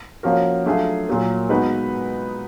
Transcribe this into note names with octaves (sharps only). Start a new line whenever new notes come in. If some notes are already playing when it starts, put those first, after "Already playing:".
F3 A#3 C#4 F#4 A#4
F#3 A3 D4 F4 G#4
A#2 F#3 A#3
G#3 B3 D#4 F#4 B4